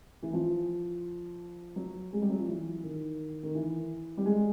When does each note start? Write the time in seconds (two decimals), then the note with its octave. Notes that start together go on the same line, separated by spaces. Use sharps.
0.23 E3
0.33 F3
1.76 F#3
2.13 G#3
2.22 G3
2.30 F#3
2.38 F3
2.47 E3
2.83 D#3
3.43 D#3
3.54 E3
4.17 G3
4.26 G#3